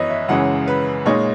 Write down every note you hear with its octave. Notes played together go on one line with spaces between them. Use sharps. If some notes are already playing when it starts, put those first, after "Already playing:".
Already playing: F#2 E3 B3 B4 C#5 D#5
E5
F#2 C#3 E3 G#3 C#4 F#5
B4
A#2 G#3 D#4 C#5